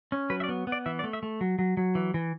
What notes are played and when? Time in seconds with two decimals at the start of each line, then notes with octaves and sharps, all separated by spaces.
0.12 C#4
0.30 F#3 B4
0.40 E5
0.44 D5
0.49 B3
0.67 B3
0.72 D5
0.86 E3 E5
0.99 D5
1.04 A3
1.13 E5
1.23 A3
1.41 F#3
1.59 F#3
1.77 F#3
1.95 E3
2.14 E3